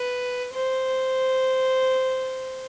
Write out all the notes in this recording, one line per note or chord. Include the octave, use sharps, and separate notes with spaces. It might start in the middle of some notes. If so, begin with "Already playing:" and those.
Already playing: B4
C5